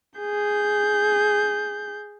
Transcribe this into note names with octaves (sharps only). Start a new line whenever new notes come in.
G#4 G6